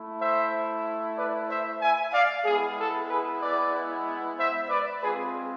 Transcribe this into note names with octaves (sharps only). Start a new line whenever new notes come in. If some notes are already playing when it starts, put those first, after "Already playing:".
Already playing: A3 E4
C5 E5
B4 D5
C5 E5
E5 G#5
D5 F5
G#3 B3 E4 G#4
A4
G#4 B4
B4 D5
C5 E5
B4 D5
G#3 C4 F4 G#4 B4